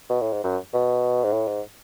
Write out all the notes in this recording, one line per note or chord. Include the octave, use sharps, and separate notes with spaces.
B2
A2
G#2
F#2
B2
G#2
A2
G#2